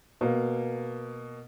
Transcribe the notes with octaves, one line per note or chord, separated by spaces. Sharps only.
B2 A#3